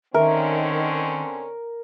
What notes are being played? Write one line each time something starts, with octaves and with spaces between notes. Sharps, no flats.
D3 D#3 C4 C#4 A#4 E5